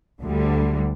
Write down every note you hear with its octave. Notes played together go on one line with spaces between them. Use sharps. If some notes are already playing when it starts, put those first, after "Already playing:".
D2 D3 G3